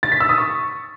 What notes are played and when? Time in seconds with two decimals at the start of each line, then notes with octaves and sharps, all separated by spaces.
0.03 A6
0.12 B6
0.20 E6
0.29 D#6
0.38 C#6